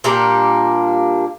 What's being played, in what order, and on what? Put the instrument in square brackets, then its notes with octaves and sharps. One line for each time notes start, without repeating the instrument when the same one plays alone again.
[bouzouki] A#2 G3 A#3 D4